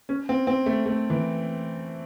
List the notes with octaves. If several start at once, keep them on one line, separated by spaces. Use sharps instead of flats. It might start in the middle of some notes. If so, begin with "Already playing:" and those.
C#4
C4
C4
A3
A3
E3